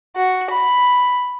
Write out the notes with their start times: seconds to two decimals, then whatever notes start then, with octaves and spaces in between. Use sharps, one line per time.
0.16 F#4
0.50 B5